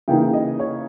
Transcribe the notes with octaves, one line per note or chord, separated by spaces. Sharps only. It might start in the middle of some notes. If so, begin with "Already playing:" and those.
C#3 E3 A#3 D#4 G5
D#5
C#5